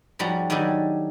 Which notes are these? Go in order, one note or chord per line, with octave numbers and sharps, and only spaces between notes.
G#2 F3 G3 C#4 F#4
D#3 F#3 G3 D4 A4 G#5